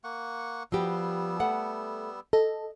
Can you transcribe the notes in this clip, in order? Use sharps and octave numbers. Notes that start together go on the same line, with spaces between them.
A#3 F#5 C#6
F3 G3 B3 F#4 G4 E6
A3 A4 F#5
A4 D#5